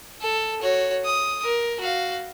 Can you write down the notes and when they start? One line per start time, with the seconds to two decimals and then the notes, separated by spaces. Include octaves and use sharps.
0.21 A4
0.61 F#4 C#5
1.04 D#6
1.43 A#4
1.80 F#4 F5